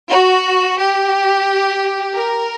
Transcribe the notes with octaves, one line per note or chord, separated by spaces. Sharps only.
F#4
G4
A#4